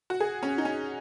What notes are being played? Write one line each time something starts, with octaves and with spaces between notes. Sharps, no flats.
F#4
G#4
C#4
D#4
C#4